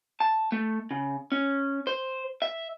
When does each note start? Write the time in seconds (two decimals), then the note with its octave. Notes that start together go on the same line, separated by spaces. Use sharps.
0.20 A5
0.52 A3
0.91 C#3
1.32 C#4
1.87 C5
2.42 E5